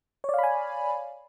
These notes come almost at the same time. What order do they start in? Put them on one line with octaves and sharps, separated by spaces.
C#5 D5 F5 B5 G#5